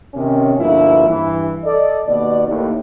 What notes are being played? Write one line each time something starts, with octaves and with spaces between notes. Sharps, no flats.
C3 D#3 C#4
G2 B2 D3 F3 A#3 E4
G2 E3
A4 D5 D#5
D#2 B2 D5
D#2 A2 D#3